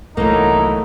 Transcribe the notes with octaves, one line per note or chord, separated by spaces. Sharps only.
C2 C3 E3 F#3 A3 A#3 D#4 E4